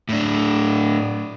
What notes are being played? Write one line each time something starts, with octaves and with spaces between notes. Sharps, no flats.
A2 D4